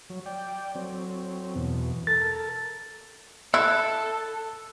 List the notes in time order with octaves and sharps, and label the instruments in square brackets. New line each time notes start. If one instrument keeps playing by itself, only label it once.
[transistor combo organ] F#3
D5 G5
F#3 C4
E2 B2
[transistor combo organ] A4 A#4 [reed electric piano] A6
[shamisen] E4 [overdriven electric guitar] A4 [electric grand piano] E6 [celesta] F#6